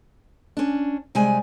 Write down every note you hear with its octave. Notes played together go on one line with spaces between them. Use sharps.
C#4 D4
C3 G3 G#3 G#5